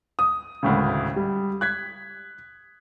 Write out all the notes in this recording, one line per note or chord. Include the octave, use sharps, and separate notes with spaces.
D#6
G#1 D2 A2 C#3
G3
F#6 G#6 B6